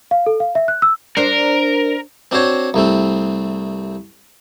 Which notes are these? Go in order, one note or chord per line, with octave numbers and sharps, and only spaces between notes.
F5
A4
F5
E5
F#6
E6
D4 A#4 C5
C4 D4 F#4 C5 C#5
C2 A3 C4